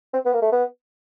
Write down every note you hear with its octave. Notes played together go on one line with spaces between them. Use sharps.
C4
B3
A#3
A3
B3